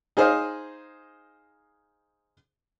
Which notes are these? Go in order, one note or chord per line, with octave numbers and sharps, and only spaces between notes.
D#4 G#4 C5 D#5 F5